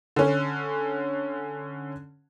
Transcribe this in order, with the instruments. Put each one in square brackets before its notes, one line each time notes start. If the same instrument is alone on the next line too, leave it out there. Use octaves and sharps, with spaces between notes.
[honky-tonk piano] D3 C#4